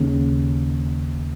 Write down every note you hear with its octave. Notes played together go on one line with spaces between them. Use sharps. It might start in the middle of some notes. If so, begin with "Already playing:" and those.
Already playing: D#2 C#3